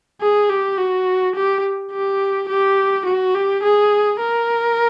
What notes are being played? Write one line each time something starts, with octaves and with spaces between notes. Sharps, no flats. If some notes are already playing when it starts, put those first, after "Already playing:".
G#4
G4
F#4
G4
G4
G4
F#4
G4
G#4
A#4